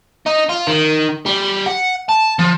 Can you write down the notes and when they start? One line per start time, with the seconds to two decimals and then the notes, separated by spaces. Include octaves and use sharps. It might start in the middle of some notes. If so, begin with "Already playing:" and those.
0.26 D#4
0.49 F4
0.67 D#3
1.26 G3
1.66 F#5
2.09 A5
2.39 F3